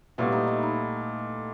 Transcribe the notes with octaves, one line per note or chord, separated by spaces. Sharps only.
A#2 G3 A3 B3 E4
D#4
E4
D#4